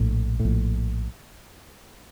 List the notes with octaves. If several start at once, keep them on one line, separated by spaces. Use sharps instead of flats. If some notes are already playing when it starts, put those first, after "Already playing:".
Already playing: A#1 A2
A2
A#1